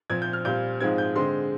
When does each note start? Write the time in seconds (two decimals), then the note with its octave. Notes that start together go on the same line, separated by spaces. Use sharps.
0.10 A#2 F3 C4 G#6
0.22 G6
0.33 F6
0.45 A#2 G3 C4 G6
0.80 G#2 F3 G#3 C4 G#6
0.98 G6
1.15 D3 G#3 C4 C6